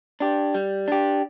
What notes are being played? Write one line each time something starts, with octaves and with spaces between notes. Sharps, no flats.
D4 G4
G3
D4 G4